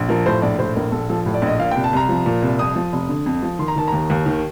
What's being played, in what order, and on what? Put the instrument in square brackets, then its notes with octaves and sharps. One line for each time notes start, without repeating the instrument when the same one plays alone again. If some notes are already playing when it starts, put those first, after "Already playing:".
Already playing: [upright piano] A#1
F3 A#4
A2 C5
A#1 D5
A2 C5
A#1 A#4
A#1 A4
F3 A4
A2
D5
A#1
D#5
A#2 F5
G5
C2
A5
C2 A#5
F3
A#2
C2
F2 D#6
F3
F1
D3
F2
F3
D#3 C6
A#5
D#3 A5
D#2 A#5
D#2
D#3